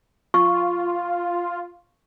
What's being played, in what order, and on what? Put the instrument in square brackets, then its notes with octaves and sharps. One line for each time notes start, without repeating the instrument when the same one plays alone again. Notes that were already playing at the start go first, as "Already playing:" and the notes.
[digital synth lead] F4 [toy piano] C#6